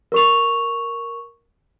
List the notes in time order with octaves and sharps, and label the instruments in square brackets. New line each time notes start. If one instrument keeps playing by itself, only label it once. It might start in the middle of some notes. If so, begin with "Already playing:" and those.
[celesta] A#4 C#6 F7